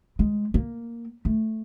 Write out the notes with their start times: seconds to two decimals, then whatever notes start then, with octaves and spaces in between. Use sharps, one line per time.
0.19 G#3
0.54 A#3
1.25 A3